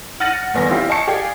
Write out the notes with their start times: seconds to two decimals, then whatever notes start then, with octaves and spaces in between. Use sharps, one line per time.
0.20 F#5 F6 A6 A#6 D#7 F#7
0.54 G1 E2 B3 G#5 A#6
0.69 C4 E4 F4 G4
0.89 D#5 G#5 A5 C#6 C#7
1.07 G4 G#4 D5 F5 G5 G#5